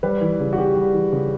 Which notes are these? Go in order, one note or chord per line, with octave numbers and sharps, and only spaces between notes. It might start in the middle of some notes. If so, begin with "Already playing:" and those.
G3 B4
E3
C#3
F#4
C#3 G4
G3
E3
C#3